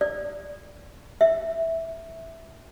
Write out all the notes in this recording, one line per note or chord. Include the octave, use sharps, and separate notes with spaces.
D5
E5